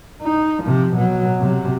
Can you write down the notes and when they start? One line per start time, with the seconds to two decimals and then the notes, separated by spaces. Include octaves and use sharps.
0.22 D#4
0.64 C3 F3
0.96 B2 F#3
1.40 C3 F#3